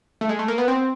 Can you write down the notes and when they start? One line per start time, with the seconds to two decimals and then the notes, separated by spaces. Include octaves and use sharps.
0.21 A3
0.29 G#3
0.39 A3
0.48 A#3
0.58 B3
0.68 C4